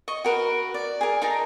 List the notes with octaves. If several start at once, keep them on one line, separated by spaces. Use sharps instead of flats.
D#5 C#6
F#4 A#4 B4
D5
G#4 A#4
D#4 A#4 A5 A#5